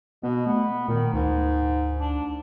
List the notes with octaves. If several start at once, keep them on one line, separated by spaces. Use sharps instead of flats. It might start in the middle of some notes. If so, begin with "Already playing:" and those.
B2 B3
A3 B3
A#2 D#3
D2 G#2
D4